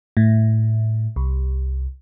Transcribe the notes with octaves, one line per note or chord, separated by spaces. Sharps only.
A2
C2